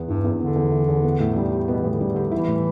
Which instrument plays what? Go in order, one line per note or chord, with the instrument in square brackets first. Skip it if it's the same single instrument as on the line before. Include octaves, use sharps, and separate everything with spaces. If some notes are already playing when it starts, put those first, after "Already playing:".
Already playing: [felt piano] E2 B3
[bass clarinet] G2 [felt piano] E3
[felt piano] E2
[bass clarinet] D3 [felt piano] B3
[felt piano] E2
E3
E2
B3
A2
G3
G4
[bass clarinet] B2 [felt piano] B3
[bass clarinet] E3
[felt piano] A2
[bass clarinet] D3
[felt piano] G3
[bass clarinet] D3
[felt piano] G4
[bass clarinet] E3 [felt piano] E4
[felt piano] A2